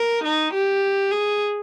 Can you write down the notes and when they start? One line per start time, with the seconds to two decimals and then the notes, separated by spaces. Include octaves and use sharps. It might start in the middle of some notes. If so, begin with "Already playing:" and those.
Already playing: A#4
0.25 D#4
0.54 G4
1.12 G#4